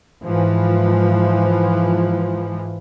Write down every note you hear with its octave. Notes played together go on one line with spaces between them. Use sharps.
G#2 E3 F3